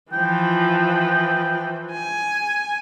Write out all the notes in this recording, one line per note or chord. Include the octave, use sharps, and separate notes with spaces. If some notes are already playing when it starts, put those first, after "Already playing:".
E3 F3 G5
G#5